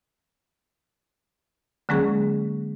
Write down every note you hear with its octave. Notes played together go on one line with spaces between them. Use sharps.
D3 F#3 G#3 A#3 C#4 G#4